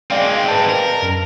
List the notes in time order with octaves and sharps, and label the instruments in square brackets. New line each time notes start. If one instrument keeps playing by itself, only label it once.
[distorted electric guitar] G#3 C4 [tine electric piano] D5 F5 G5
[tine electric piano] B4 A5
[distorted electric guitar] A#4
[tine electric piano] F#2